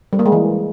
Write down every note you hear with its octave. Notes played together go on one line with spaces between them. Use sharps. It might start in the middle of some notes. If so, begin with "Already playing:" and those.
G3
A#3
G#3
E3